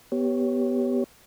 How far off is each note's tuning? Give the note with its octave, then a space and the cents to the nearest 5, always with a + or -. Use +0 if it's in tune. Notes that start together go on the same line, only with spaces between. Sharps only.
B3 +0 G4 -5 C#5 +0